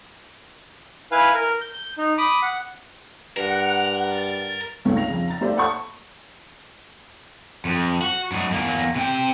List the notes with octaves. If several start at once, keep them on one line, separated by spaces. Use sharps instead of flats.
E4 B4 F5 G#5
A#4
G6
D#4
B5 D6 D#6
F#5
G2 A#4 F#5
A6
G1 C#2 G#2 A3 C#5
A#6 F7
F2 C#3
A#5 A6
A3 A#3 G4 C5 D5 E5
A4 F#5 B5 C#6
F2
F#4
F#2 D#4
E2 A#3
C3 G5